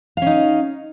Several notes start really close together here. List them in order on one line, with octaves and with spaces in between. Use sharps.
F5 C#4 D#4